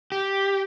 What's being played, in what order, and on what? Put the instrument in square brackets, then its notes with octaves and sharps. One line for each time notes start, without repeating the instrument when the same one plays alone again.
[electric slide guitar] G4